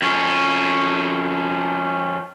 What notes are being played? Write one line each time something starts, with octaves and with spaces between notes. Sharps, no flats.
F2 C#4